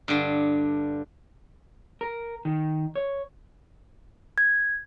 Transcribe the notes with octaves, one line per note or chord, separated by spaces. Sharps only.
G2 D3
A#4
D#3
C#5
G#6